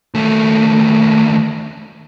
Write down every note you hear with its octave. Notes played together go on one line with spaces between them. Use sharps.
D#2 A3